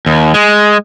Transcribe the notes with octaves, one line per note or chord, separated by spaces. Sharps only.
D#2
G#3